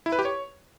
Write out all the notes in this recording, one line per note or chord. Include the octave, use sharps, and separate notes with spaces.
E4
B4
G4
C#5